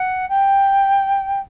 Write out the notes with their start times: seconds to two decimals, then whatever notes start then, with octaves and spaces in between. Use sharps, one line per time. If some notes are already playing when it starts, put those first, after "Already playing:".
Already playing: F#5
0.29 G5